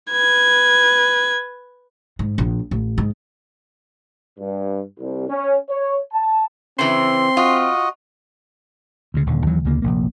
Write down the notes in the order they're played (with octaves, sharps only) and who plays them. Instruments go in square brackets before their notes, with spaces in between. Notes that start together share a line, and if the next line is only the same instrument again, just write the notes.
[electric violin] B4 G#6
[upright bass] G#2
A#1
A1
G#2
[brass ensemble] G2
C2
C#4
C#5
A5
[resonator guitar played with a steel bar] C#3 E3 [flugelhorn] C4 [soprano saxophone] C6
[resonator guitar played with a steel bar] F4 [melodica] F#4 D#5
[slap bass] D2 C#3
D#1 D#2 D3
D#2 D#3 E3 F#3
D2 C#3 A#3
F1 A#1 A#3